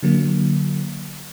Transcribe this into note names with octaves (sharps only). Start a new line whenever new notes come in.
D3 F#3 A#3